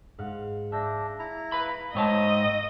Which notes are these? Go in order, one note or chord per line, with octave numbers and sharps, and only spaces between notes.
G#2 F5 F#5
D4 E5 G6 A#6
E4 A#5
B4 F5 B5
G#2 C4 C#5 D#5 A5